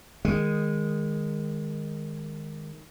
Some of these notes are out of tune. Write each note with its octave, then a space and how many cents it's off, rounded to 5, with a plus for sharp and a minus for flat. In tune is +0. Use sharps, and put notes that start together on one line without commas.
D#3 -10 G#3 -15